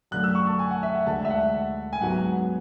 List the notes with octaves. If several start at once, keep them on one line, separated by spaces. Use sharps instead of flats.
F#2 D3 A3 F#6
E6
C#6
A5
G#5
F#5
E5
F#5
D2 D3 G#3 A5
E5
F#5
G#5
G#2 F#3 B3 F#5